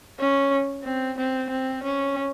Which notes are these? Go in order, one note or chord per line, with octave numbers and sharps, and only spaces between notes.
C#4
C4
C4
C4
C#4